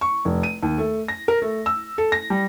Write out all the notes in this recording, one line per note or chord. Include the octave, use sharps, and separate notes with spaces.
C#6
F1
D#7
D#2
A3
A#6
A#4
A3
E6
A4
A#6
G3